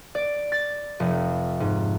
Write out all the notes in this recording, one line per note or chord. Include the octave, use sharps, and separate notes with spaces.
D5
A6
F1
G#2